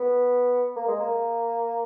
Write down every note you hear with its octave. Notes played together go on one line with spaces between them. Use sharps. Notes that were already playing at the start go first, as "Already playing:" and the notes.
Already playing: B3
A#3
G#3
A#3